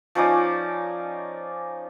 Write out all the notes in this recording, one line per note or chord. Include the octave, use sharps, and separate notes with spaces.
F3 C#4 D#4 D5